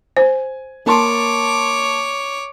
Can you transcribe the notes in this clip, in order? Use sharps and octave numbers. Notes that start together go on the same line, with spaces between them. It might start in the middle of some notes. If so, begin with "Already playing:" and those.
C5 G#5
A#3 C#5 A5 C6 D6